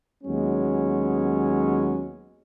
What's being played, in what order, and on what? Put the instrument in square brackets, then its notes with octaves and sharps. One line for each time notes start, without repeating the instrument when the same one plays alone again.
[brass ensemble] D#2 F#3 G#3 B3 C#4